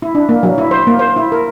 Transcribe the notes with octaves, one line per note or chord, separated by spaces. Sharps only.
E4
D4
A#3
F#3
E4
C5
A#3
C5
E4
A#4